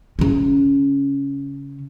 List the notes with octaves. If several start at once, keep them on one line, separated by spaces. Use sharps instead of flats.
C#3 C#4